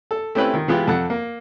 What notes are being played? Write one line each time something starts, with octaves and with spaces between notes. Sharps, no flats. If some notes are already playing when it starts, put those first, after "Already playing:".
A4
A3 C4 C#4 E4 G4 B4
D#3
E3 G#3 B3 F4 G4
F2 A4 F#5
A#3